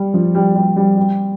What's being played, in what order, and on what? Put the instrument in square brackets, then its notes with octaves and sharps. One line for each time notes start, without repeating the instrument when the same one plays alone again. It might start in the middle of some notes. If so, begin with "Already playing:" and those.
Already playing: [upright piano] G3
F3
G3
G3
G3
G3